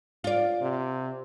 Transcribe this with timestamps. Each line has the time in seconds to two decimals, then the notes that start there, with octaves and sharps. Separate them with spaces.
0.24 F4 D5
0.62 C3